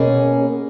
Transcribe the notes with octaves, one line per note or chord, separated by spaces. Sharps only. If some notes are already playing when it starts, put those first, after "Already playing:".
Already playing: B2 A#3 C#4 G#4